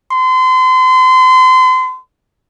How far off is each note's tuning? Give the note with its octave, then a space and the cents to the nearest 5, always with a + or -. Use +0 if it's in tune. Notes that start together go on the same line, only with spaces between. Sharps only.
C6 -35